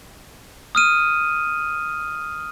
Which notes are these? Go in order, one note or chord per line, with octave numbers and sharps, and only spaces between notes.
D#6 F6 D#7